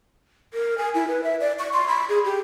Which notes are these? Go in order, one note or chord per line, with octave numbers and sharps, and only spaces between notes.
A#4
G#5
E4
B4
E5
D5
C#6
C6
B5
G#4
G4